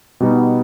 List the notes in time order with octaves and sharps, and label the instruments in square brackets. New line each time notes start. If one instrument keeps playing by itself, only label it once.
[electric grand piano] B2 G3 B3 D#4